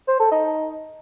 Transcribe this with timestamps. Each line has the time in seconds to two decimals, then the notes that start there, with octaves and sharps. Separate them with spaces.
0.08 C5
0.20 A4
0.32 D#4